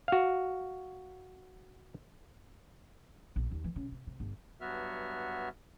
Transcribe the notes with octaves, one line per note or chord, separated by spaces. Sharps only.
F#4 F5
A#1
D#2
E3
C#3
C3
C3
G1
G2 F#3 B3 F#4 E5 F6